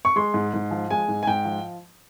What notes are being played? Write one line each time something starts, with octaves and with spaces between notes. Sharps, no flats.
C#6
G#3 C6
G#2
G#2
F3
G#3 G#5
G#2
G#5
G#2 G5
F3